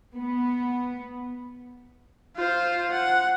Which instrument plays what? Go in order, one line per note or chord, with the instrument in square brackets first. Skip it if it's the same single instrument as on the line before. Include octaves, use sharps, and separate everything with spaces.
[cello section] B3
[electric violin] F4 C5
F#5